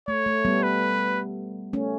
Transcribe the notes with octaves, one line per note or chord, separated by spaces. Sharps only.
A3 C#5
A3
G3 B3
B4
A3 C#4